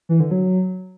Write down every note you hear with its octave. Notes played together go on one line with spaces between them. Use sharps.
E3
D3
F#3